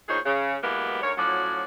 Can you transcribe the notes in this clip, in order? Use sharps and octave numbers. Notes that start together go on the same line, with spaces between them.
E2 A#2 D#4 G#4 C5 C#5
C#3
E3 F#3 G#3 A#3 B3 G4
D2 G#2 A#4 C#5
A2 F3 F#3 C#4 F#4 D5